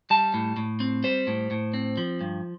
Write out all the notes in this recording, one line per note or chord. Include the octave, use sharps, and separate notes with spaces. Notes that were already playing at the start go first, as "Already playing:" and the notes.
G3 A5
A2
A2
C4
G3 C5
A2
A2
C4
F3
G2